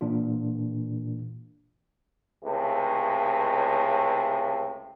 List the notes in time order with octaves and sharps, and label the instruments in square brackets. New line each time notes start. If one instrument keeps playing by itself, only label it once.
[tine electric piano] A#2 E3 D4 F4
[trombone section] C#2 A2 C3